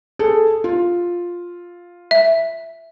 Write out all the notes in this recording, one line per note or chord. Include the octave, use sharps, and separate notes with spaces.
G#4 A4
F4
E5